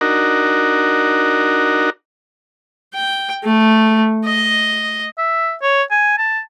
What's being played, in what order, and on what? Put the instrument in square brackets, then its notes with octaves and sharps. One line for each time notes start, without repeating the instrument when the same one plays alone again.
[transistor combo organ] D4 D#4 F#4 A#4
[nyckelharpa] G5
A3
D#5
[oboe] E5
C#5
G#5
A5